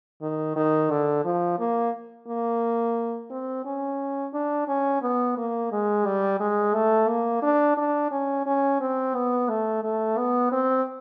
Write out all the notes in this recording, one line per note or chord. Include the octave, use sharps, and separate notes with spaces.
D#3
D#3
D3
F3
A#3
A#3
C4
C#4
D4
C#4
B3
A#3
G#3
G3
G#3
A3
A#3
D4
D4
C#4
C#4
C4
B3
A3
A3
B3
C4